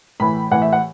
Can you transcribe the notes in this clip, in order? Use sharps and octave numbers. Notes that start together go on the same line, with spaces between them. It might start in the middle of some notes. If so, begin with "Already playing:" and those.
A2 E3 B5
A2 E3 F#5
E5
F#5